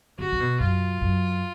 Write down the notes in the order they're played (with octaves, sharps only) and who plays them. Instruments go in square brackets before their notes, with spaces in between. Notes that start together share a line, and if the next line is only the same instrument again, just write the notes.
[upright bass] D3 [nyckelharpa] F#4
[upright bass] D3
B2
[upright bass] F#2 [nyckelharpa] F4
[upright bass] F#2